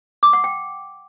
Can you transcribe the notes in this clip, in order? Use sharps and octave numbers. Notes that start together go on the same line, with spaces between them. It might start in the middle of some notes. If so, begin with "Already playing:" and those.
D6
F#5
G5